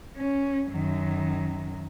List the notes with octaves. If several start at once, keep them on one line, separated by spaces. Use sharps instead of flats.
C#4
F#2 D#3